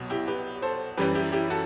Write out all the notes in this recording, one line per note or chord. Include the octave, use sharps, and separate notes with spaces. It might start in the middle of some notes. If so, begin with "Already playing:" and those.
Already playing: C2 B2 F#3
E4 G4
G4 B4
A4 C5
F#2 E3 G3 G4 B4
E4 G4
E4 G4
F#4 A4